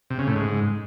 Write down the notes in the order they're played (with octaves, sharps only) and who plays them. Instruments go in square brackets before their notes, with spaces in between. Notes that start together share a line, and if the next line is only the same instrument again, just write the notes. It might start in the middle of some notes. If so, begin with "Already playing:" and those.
[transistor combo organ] C3
C#3
A2
G#2